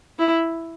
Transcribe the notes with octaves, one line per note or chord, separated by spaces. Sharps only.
E4